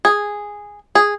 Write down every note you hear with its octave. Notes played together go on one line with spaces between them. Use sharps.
G#4
G#4